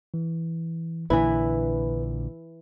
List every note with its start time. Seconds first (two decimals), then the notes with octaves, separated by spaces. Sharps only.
0.14 E3
1.10 A#1 A#2 D3 E3 E4 B4